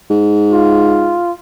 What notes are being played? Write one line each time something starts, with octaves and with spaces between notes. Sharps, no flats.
G#2
F4